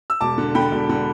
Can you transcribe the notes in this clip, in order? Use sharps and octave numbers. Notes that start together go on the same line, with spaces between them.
E6
E1 A5 D6
D3
D3 G5 B5
E1
D3